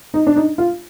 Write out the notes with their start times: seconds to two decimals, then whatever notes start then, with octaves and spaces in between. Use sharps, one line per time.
0.14 D#4
0.27 D4
0.36 D#4
0.58 F4